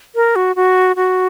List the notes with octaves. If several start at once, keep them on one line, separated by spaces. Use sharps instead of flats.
A#4
F#4
F#4
F#4